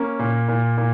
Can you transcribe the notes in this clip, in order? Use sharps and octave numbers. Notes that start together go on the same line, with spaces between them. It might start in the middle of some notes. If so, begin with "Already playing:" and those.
Already playing: A#3 C#4
A#2
A#2
A#2